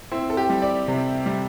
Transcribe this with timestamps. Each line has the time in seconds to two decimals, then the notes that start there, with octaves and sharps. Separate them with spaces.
0.12 C4 E4
0.30 A4
0.37 G4
0.50 G3
0.62 D5
0.88 C3
1.26 G3